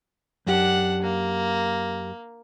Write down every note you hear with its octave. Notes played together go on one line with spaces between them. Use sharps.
F#2 D4 G4 F#5
A#3